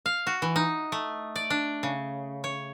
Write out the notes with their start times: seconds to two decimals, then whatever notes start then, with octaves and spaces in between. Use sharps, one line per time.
0.06 F5
0.27 F#4
0.42 E3
0.56 D#4
0.92 A3
1.36 D5
1.50 D4
1.83 C#3
2.44 C#5